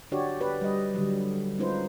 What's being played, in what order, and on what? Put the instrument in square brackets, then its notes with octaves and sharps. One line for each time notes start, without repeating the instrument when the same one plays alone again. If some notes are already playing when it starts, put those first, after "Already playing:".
[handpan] D3 D4 F#4 G4 C#5 D5
G4 B4 D5
G3 D#5
D3 F#3 G3
G#3 C#4 D#4 F4 B4 C5